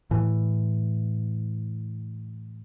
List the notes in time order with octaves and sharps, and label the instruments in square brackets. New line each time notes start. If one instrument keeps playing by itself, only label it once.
[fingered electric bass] A2 E3